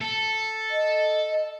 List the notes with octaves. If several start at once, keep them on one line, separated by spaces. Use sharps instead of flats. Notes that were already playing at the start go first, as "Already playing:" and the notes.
A4
D#5